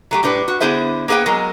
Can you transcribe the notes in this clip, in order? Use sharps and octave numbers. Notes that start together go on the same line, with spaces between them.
F#3 A3 G4
A2 G3 D4 B4
F#4
D3 B3 E4 G#4 C5 E5
A#3 B3 G#4 B4 G5
F#3 G#3 A#4